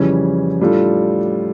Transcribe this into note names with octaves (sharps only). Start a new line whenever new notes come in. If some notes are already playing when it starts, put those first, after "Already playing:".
Already playing: F2 C#3 E3 G3 C#4
A2 G3 D4 F4 A4